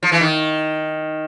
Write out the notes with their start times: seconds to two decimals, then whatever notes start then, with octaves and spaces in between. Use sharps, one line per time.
0.03 F3
0.12 E3
0.21 D#3